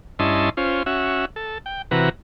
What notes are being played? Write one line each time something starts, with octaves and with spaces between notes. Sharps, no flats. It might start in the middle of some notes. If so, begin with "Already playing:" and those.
G2 C#4 E4 D#5 A5 C6
C#4 F4 C5
C#4 F#4 E5
A4
G5
C3 E3 F#4 B4 A#5